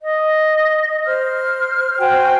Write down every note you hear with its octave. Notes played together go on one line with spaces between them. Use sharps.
D#5
C5 F6
F#4 C5 G5 G#5